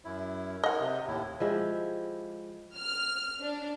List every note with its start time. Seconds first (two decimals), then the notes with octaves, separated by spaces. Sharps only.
0.05 F#2 E4
0.64 D#4 A#4 D#5 F#5
0.80 C3
1.07 D#2 A2 E4
1.40 F3 G#3 E4 G4
2.77 F6
3.42 D4